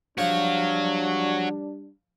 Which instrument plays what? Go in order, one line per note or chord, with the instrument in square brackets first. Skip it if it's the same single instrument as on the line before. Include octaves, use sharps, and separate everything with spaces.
[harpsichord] F3 F4 [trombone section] G3 D4 [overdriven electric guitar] F#4 C#5